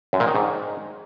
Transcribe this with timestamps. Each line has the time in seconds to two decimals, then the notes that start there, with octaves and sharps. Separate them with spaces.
0.13 F#2
0.20 A#2
0.27 D#3
0.35 G#2